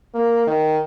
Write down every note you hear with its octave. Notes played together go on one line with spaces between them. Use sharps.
A#3
D#3